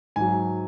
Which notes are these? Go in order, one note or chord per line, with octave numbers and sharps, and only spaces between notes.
G#2 F#3 G#5